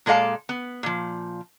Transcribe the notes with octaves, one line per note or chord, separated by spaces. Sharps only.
A#2 G#3 A4 D5 F5 A5
B3
A#2 F3